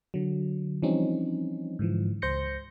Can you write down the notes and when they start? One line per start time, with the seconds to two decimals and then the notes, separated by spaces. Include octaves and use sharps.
0.14 D3 F#3
0.82 E3 F3 G3 C4 C#4 D#4
1.79 G#2 D3 E3 F3
2.22 C#2 C5 C6 G6 A#6 C#7